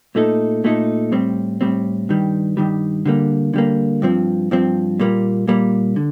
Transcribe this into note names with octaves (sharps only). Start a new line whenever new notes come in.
A#2 A3 D#4 A4
A#2 A3 D#4 A4
A2 G3 C4
A2 G3 C4
G2 D#3 G3
G2 D#3 G3
D3 G3 A#3
D3 G3 A#3
G2 F3 C4
G2 F3 C4
A#2 G3 A#3
A#2 G3 A#3
D3